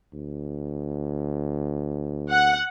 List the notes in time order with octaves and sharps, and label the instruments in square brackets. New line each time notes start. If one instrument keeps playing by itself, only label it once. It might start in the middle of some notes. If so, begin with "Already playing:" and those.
[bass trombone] D2
[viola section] F#5